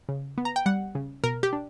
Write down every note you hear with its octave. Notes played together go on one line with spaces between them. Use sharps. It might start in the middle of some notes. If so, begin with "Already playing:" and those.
C#3
B3
A#5
G5
G3 F#5
C#3
B2 A#4
G4
D4